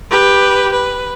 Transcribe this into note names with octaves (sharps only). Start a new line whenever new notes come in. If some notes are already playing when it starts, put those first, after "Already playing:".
G4 B4
B4